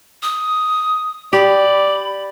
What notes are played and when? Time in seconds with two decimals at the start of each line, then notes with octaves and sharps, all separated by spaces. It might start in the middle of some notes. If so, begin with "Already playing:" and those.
0.23 D#6
1.33 G4 D5 B5